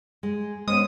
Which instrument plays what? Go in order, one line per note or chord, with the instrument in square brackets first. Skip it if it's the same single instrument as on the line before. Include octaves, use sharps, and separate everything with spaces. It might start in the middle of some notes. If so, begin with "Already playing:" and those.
[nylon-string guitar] G#3
[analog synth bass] G#3 [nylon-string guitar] B3 C#4 C5 [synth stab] D#6